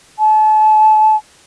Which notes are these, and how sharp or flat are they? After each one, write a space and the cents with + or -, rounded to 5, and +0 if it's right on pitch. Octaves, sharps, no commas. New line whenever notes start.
A5 -35